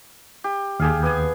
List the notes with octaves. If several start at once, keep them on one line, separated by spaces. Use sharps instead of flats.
G4
D#2 G4 G#4 F5
B3 G#5